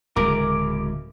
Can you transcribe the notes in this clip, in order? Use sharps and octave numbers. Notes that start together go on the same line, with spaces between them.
D1 C#3 G#3 A#4 D6